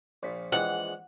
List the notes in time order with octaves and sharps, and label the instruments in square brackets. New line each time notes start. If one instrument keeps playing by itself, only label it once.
[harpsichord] A#1 A#2 B5
[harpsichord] A#1 E3 G#3 [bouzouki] F#5